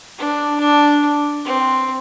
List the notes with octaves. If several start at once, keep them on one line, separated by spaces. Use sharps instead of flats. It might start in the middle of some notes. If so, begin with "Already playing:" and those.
D4
D4
C4